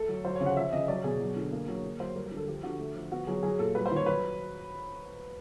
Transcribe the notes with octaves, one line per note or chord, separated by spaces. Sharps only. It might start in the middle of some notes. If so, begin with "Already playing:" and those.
Already playing: A3 A4
F#3
F#3 C5
C#5
C#3
F#5
F3 E5
C#3 D#5
F#3 D5
B2 G#4
F#3
D3
A#3
F#3
A#3
F#3 C5
G3 A#4
A#4
D3
A4
F3 G4
D3 F#4
A3
F3
B3 F#4
F#3 G#4
F#3 G#4
A#2 A4
G3 B4
C5
D#3
C#5
F#3 B4